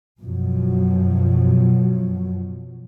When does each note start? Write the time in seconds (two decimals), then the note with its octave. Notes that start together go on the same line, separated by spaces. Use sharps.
0.22 F#2 B2 F3 F#3